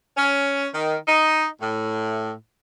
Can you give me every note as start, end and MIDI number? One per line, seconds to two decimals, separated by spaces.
0.16 0.68 61
0.73 0.95 51
1.07 1.46 63
1.60 2.33 45